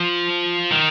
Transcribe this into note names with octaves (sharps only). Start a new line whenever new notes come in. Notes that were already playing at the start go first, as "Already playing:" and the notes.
Already playing: F3
D#3